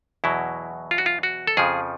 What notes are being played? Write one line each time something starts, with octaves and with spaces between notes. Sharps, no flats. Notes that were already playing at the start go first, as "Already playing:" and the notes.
E2 B2 F#3 E4
F4
F#4
F4
F#4
A4
F2 C#3 F3 G#4